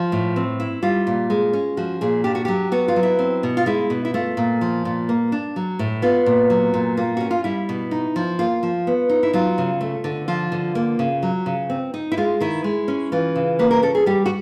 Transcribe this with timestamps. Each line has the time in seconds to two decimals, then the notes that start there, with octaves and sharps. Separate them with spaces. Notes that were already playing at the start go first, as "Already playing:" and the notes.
Already playing: F3
0.12 A2
0.36 C4
0.60 E4
0.82 G3 F4
1.07 A#2
1.30 G#3
1.53 C#4
1.77 F3 F#4
2.01 A#2 G#4
2.24 D4 G4
2.35 F#4
2.45 F#3 G4
2.72 B3 F#4
2.88 F4
2.96 F#3
3.03 E4
3.19 C4
3.43 B2
3.57 F4
3.66 G#3 E4
3.90 B2
4.05 E4
4.14 A3 F4
4.37 A#2
4.61 F3
4.85 A#2
5.09 A#3
5.32 D4
5.56 F#3
5.79 A2
6.02 B3 F4
6.26 A#2
6.50 F#3
6.74 A#2
6.97 A#3 F4
7.17 C#4 F#4
7.31 F4
7.44 G3 E4
7.69 B2
7.91 D#4
8.16 F3
8.39 A#3 F4
8.63 F3
8.87 B3
9.09 D#4
9.23 E4
9.33 F#3 F4
9.58 C#3
9.81 A3
10.04 D3
10.28 F3 F4
10.52 D3
10.75 A#3
10.99 C#3
11.23 F#3
11.46 C#3
11.70 C4
11.94 D#4
12.12 E4
12.17 G#3 F4
12.40 D#3 E4
12.64 G#3
12.88 C#4
13.12 E3 F4
13.36 C#3
13.59 A#3 B4
13.71 A#4
13.83 C#4 A4
13.95 G#4
14.06 G3 G4
14.26 F#4